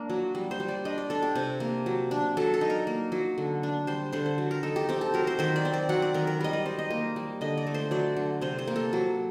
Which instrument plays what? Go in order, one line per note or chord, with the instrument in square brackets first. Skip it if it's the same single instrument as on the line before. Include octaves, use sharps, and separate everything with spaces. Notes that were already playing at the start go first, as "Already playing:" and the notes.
Already playing: [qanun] A#3 D4 A#4
F#3
G3
C5
G3
D5
D4 D#5
D5
D4 A4
G4
C3
A#3
F#3
D4
F#3 A4
A4
D#4
A#4
A#3
F#3
D3
D4
G3 C5
D3 C5
C5
F#3
A#4
D#4 A4
G4
C4 G4
A4
F#3 A#4
C5
D#3 C5
D5
C4
D5
F#3 F#5
D5
D#3 A#4
A#4
G3 D#5
D5
D#4 C5
D#5
A#3
G3
D3 D#5
D5
A3
C5
F#3 D5
D3
C3 C5
C5
A#3
A4
F#3